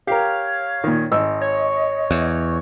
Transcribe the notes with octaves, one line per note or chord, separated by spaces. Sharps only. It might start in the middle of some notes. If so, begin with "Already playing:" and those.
G4 A#4 C#5 F5
A#2 D#3
G#1 D#5 E6
C#5
E2